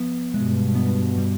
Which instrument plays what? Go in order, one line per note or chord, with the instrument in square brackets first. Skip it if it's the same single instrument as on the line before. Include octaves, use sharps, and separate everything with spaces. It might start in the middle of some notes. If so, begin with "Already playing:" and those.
Already playing: [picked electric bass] F3 B3
[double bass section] G2 B2 [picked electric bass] G#3
[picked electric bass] B3
G3